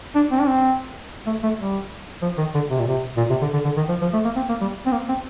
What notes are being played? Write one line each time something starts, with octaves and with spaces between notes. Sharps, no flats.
D4
C4
D4
C4
A3
A3
G3
F3
D#3
D3
C3
A#2
C3
A#2
C3
D3
D3
D3
D#3
F3
F3
A3
A#3
C4
A#3
G3
C4
A#3
C4